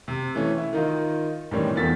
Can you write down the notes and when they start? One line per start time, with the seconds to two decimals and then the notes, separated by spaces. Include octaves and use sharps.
0.08 C3
0.35 E3 A3 C#4
0.58 E4
0.73 D#3 D#4 F4
1.51 A2 D#3 E3 G3 C4 C#4
1.75 E2 D#3 F3 A4 A6 B6